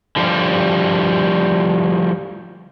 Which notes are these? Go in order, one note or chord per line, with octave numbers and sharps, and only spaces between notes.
D3 F3 G3